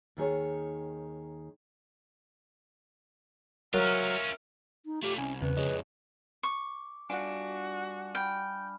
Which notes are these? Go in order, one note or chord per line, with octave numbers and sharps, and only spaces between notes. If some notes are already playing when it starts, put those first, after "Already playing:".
D#2 D#3 G#4 C#5
F#3 C#4 F4 A#4 E5 F6
D#4
A3 F4 G4
C2 C#4 G#5
E2 C#3 B4
F2 G#3 G#4 C#5 D#5
C#6 D6
G2 D4 F4 F#4 F#5 G#5
G5 B5 F6